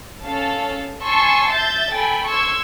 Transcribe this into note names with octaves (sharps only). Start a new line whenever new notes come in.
C#4 A4 F5 A5
G#5 A5 C6 C#6 E6
E5 G6 A6
A4 G5 G#5 B5
C6 C#6 E6 G#6